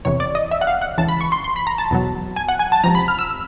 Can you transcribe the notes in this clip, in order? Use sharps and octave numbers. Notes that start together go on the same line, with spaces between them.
E2 C3 E3 C#5
D5
D#5
E5
F#5
F5
F#5
C#2 C#3 E3 A5
B5
C#6
C6
C6
B5
A#5
A5
E2 B2 F#3
G#5
F#5
G#5
A5
C#2 C3 F3 A#5
B5
F6
E6